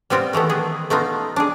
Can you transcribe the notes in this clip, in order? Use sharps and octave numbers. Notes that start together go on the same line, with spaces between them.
G3 B3 C4 F4
D#3 E3 A3 B3
B3 G#4
A3 B3 D#4 F4
D4 G#4